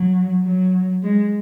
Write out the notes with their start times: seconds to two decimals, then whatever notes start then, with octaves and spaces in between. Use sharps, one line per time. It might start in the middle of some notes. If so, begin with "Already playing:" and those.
Already playing: F#3
0.43 F#3
1.02 G#3